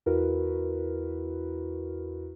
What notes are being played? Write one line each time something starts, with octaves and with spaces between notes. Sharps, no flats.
E2 E4 F#4 A#4 B4